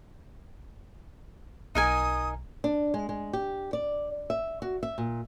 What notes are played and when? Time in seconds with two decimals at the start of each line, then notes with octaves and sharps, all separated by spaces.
1.75 B1 D#4 A#4 G#5 D#6
2.64 D4
2.94 G#3
3.09 G#3
3.33 G4
3.73 D5
4.30 E5
4.62 F#4
4.83 E5
4.98 A#2